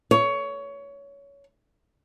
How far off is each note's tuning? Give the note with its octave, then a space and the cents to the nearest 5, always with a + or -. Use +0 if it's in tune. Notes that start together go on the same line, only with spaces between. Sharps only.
C#5 +20